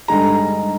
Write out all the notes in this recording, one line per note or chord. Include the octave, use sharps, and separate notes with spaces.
G2 D3 G#3 D#4 G#4 A#5